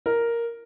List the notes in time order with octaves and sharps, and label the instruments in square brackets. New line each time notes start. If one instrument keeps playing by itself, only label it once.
[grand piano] A#4